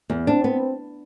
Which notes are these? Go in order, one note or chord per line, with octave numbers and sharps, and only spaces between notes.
E2
C4 D4
B3